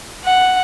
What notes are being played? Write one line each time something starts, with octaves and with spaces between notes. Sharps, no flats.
F#5